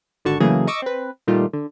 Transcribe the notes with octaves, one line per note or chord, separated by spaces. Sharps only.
G#1 D3 F#4 A5 C#6
C#3 E3 F#3 A3 A#3 G#4
D#5 C#6 D6 E6
C4 B4
A#2 D#3 G3 A3 F4 G4
D3